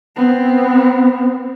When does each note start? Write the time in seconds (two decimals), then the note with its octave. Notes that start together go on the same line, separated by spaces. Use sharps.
0.16 B3 C4